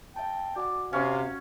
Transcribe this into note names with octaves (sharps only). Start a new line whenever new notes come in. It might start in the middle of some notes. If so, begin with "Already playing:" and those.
E5 G5 A5
F#4 D5 F#5 G#5
C3 C#4 F5